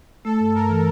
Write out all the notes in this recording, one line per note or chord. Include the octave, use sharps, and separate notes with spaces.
A3 A4
G2
G2 A#4
E3